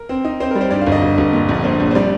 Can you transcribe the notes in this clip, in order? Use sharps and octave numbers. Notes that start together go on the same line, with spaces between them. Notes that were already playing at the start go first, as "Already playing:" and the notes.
Already playing: A#4
C4
D#4
C4 C5
G3 A#4
C5
G2 D5
F5
G1
D#5
G1
G1
A#2
A#1
A#2 C5
A#1
C5
G3 D5